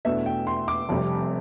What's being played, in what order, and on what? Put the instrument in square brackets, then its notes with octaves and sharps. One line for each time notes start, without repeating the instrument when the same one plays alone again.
[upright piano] E2 B2 A3 D4 E5
G5
C6
D6
F1 F2 C3 G3